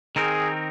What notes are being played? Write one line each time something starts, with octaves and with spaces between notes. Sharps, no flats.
D#3 C4 D#4 G#4 A#4